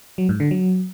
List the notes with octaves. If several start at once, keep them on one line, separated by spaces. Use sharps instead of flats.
F#3
G#2
D3
F#3